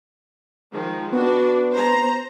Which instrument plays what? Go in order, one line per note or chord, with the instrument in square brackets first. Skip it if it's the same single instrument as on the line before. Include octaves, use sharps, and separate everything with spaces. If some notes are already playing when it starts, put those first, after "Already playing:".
[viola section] D#3 F3 G#3
[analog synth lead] B3 [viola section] D4 F#4
[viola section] C5 A#5